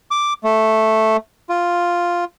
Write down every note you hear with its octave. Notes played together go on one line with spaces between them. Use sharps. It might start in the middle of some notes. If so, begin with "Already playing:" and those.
D6
A3
F4